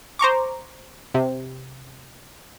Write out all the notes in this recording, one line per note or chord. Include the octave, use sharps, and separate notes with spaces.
C5 A#5 C#6 D6
C3